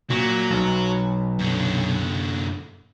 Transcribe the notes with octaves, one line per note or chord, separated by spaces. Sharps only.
A#2 F#3
B1
F#2 D3